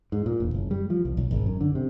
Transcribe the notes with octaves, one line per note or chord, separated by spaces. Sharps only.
G#2
A#2
E1
F#1
G3
F3
C2
B1
G#1
F#2
D3
C3